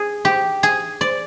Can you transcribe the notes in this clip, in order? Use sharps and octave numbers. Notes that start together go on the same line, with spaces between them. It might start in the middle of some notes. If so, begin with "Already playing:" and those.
Already playing: G#4
G4
G#4
D5